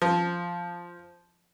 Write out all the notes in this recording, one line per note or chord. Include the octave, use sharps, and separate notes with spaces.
F3